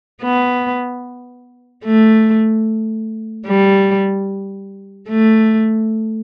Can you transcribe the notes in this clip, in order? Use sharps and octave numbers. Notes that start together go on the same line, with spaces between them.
B3
A3
G3
A3